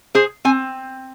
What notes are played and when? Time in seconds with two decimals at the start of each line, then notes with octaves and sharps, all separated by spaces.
0.15 G#4 C5
0.45 C4 G#5